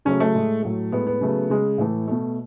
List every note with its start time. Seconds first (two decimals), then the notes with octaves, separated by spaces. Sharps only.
0.05 C#3 F#3 A3 C#4
0.20 A3
0.35 A2 G#3
0.63 A2 F#3 A3
0.92 A2 G#3 B3
1.07 B3
1.21 C#3 F#3 A3
1.50 C#3 G#3
1.78 A2 E3 A3
2.08 B2 A3